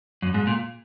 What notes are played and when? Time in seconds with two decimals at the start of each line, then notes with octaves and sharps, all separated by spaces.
0.22 F#2
0.34 G#2
0.47 A#2